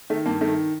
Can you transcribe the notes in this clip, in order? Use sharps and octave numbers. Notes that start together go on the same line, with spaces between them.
D#3 A3
G2 A#3
D#3 A3